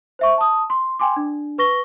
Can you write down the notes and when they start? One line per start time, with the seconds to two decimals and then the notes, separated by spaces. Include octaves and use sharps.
0.19 C5 E5 C#6
0.38 A5 D#6
0.70 C6
0.99 G5 G#5 C6 D6
1.16 D4
1.58 B4 C#6 A#6 G7